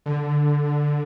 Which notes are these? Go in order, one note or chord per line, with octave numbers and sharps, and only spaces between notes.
D3